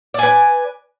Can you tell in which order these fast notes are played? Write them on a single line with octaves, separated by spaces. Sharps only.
D5 G#5 B4